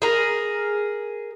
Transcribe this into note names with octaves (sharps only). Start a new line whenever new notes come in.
G#4 A#4